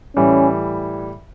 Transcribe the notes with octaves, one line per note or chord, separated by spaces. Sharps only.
A2 E3 G3 C#4